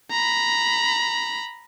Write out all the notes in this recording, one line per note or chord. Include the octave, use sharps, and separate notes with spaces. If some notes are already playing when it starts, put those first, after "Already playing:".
A#5 B5